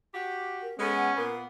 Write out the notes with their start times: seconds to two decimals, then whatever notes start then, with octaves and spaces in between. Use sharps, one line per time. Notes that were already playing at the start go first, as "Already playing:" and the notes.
0.14 F#4 G4
0.63 A#4
0.79 G#3 B3 C#4 A4
0.96 F#5
1.16 A#2 A#3 B3 A#4